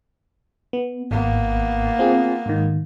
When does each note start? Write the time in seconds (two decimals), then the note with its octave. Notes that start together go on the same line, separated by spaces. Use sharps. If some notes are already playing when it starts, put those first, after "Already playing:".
0.73 B3
1.11 G#1 A#3 B3
1.99 C4 F4 G#4
2.46 G#2 D#3